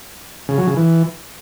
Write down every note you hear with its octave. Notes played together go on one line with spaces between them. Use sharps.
C#3
F#3
C#3
E3